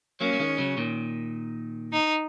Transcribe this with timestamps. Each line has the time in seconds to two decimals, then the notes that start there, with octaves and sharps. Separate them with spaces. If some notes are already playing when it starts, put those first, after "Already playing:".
0.21 F#3 A#3 C#4
0.33 F#3
0.39 D#3 G#3
0.58 C#3 F#3
0.77 A#2 D#3
1.93 D#4